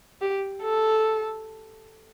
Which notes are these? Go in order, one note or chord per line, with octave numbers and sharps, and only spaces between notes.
G4
A4